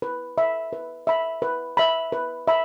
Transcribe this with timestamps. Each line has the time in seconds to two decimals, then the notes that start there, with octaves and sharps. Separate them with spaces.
0.02 B4
0.38 E5 B5
0.73 B4
1.07 E5 B5
1.42 B4
1.77 E5 B5
2.12 B4
2.48 E5 B5